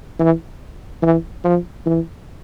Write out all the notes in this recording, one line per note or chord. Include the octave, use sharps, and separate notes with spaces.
E3
E3
F3
E3